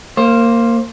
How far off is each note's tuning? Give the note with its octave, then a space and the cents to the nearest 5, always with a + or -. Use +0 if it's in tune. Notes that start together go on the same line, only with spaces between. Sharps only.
A#3 -15 C5 +15